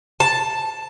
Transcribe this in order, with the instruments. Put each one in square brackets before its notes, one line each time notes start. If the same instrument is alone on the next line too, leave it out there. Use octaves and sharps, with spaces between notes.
[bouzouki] A5